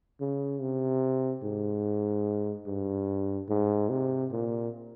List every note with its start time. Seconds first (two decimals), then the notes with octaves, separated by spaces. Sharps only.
0.21 C#3
0.61 C3
1.44 G#2
2.67 G2
3.49 G#2
3.90 C3
4.32 A#2